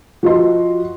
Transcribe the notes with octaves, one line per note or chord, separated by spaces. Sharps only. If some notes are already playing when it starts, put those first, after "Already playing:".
F3 F#4 B4 D#5 C6